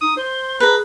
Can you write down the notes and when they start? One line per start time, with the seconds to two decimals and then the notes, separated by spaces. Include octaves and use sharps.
0.01 D#4 D#6
0.17 C5 C6
0.60 G#4 B4 A#5